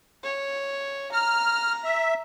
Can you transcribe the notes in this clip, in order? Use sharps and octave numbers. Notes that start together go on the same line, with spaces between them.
C#5
A#5 F6
E5